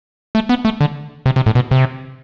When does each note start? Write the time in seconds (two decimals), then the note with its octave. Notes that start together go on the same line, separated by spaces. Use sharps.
0.35 A3
0.49 B3
0.65 A3
0.81 D3
1.26 C3
1.36 C3
1.46 A2
1.55 B2
1.71 C3